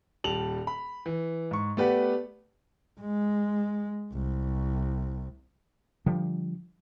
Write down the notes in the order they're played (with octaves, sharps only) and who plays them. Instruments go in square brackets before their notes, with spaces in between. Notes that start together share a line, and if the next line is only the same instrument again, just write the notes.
[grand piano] D#1 G3 A5 F7 F#7
B5
E3
G#2 C#6
A3 B3 G4 B4 D5 F#5
[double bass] G#3
C2
[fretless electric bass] D3 F3 G3